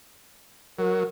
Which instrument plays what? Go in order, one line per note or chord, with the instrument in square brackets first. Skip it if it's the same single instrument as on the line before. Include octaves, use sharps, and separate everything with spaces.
[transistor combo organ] F#3 [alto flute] A#4